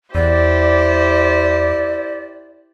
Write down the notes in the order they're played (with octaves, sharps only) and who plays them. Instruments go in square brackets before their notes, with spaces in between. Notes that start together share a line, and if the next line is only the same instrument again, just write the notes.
[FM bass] E2 [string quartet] E4 G4 C5 [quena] D5